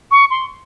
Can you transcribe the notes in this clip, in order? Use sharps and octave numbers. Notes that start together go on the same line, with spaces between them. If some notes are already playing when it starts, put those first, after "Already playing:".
C#6
C6